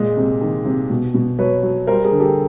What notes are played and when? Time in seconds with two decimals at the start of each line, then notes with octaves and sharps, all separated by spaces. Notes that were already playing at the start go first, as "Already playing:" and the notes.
Already playing: A#2 G#3
0.17 C3
0.41 D#3
0.65 C3
0.90 B2
1.14 B2
1.38 F#3 B4 C#5
1.63 F#3
1.87 G3 A#4 C5
2.04 G#4 A#4
2.11 D3
2.20 G4 A4